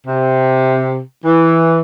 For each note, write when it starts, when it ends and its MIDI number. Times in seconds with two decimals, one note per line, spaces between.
0.07 0.98 48
1.25 1.79 52